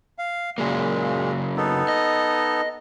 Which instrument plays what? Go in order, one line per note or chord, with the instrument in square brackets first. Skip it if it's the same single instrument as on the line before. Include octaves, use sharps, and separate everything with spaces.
[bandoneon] F5
[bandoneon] A#2 G#3 [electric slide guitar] C#3 F#3 A#3
[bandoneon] B3 D#4 A4
[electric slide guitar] D#5